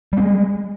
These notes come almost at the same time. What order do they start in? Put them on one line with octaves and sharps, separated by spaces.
G3 C4 G#3